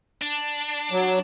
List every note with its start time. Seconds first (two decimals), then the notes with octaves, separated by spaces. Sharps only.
0.21 D4
0.92 F#3